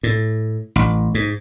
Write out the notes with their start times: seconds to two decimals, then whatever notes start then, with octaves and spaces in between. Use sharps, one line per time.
0.03 A2
0.76 A1
1.15 G#2